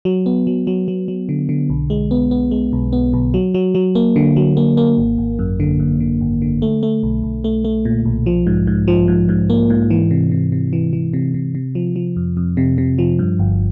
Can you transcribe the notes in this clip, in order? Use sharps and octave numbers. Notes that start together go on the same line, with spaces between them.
F#3
B3
F#3
F#3
F#3
F#3
D3
D3
B1
G#3
B3
B3
G#3
B1
B3
B1
F#3
F#3
F#3
A#3
D3
F#3
A#3
A#3
G#1
G#1
F#2
D3
F#2
D3
G#1
D3
A3
A3
B1
B1
A3
A3
A#2
B1
F3
G#2
G#2
F3
G#2
G#2
A#3
G#2
E3
C3
C3
C3
E3
E3
C3
C3
C3
F3
F3
F2
F2
C3
C3
F3
G2
G1